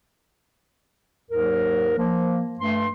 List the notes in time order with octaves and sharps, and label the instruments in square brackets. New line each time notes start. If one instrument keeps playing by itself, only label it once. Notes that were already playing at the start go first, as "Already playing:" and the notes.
[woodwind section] D#2 G#2 F#3 A#4
F3 A#3
G2 A3 C6